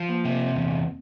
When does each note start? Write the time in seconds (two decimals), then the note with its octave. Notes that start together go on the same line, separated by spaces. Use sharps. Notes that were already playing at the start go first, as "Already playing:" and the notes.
Already playing: F3
0.09 A#3
0.25 C3 A#3
0.40 C4
0.55 E2